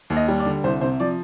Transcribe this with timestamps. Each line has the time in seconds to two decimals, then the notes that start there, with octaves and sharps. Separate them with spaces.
0.10 D#2
0.16 D#5
0.28 G3
0.40 D5
0.46 D3
0.64 C2 C5
0.81 C3 C5
1.00 F3 D5